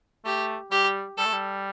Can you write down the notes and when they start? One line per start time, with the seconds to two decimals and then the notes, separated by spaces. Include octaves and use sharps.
0.25 A3 G4
0.71 G3 G4
1.18 G3 A4
1.25 A3
1.33 G3